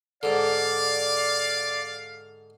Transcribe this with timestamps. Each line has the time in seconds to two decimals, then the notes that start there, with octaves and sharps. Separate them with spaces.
0.23 G#2 D3 D5 F5